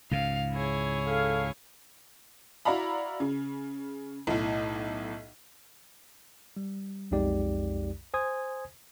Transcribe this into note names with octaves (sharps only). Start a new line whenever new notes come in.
C#2 G#2 C#3 F5
E4 G#4 C#5
A4 F5
E4 F#4 D5 F5 A#5 B5
C#3
B1 A2
G3
B1 F2 G#3 D#4 G4 D5
C5 G#5 D#6 G#6